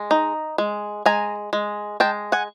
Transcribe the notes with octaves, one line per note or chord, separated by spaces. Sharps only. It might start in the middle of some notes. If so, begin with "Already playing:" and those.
Already playing: G#3
D#4
G#3
G#3 G#5 A#5
G#3
G#3 G5 A5
F#5 G#5